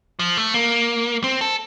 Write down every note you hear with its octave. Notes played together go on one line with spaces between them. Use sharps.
F3
A3
A#3
C4
A4